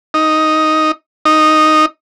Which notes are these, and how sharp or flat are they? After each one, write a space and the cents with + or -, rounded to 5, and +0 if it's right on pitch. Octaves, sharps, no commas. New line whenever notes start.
D#4 +5
D#4 -5